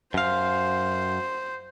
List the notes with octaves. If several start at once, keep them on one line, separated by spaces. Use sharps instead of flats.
F#2 C5 F5